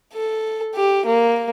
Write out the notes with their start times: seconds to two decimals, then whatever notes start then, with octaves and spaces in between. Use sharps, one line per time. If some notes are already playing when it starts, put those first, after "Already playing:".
0.14 A4
0.75 G4
1.06 A#3